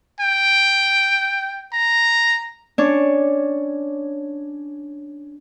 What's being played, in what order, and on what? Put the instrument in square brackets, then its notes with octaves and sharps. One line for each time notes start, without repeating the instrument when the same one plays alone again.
[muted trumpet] G5
A#5
[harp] C#4 D4 C#5